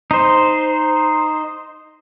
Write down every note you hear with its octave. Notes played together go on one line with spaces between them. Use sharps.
D#4 C5